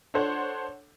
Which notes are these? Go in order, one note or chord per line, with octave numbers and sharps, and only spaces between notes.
D4 A4 C5 C#5 F#5